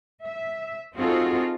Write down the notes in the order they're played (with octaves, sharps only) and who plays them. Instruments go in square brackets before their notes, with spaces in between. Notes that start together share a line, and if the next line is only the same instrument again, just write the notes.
[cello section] E5
C4 D#4 F4 F#4 G#4 A4